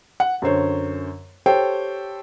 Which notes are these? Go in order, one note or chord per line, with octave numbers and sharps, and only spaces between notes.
F#5
F#2 D3 C5 C#5
G4 A4 C5 C#5 G5